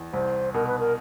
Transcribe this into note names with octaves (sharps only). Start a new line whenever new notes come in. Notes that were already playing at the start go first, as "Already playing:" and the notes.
Already playing: E2
C2 C5
B2 A#4
B4
A#4